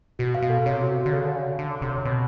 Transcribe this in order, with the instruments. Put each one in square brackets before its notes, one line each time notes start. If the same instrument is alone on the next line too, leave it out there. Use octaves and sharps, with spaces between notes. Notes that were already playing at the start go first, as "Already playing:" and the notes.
[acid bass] B2 [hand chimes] F#4
[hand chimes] F5
[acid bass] B2
[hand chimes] A4
[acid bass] C3 [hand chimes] C#5
[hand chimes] F#4
F5
[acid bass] D3
[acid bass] C#3 [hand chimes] A4
[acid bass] D3 [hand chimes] C#5
[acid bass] C#3
[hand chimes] F#4
[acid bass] D3 [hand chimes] F5
[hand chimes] A4
[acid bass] C3
[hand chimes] C#5
[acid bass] B2 [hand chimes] C4